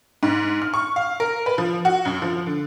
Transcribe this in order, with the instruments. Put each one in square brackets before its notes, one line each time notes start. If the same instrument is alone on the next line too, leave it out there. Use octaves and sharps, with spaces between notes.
[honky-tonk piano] G#2
F6
C#6
F5
A#4
B4
F3
F#4
F#2
F3
D3